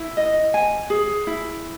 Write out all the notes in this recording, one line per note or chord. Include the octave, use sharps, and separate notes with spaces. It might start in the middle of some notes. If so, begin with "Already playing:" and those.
Already playing: E4
D#5
G#5
G#4
E4